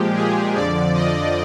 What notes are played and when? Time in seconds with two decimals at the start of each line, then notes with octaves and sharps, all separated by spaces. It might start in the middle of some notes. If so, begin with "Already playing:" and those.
Already playing: A#2 F3 G#3 G4
0.15 G#4
0.55 F2 D3 F3 D5
0.94 D#5